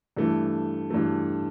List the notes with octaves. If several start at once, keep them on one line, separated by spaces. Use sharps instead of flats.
G2 E3 A3
G2 E3 A3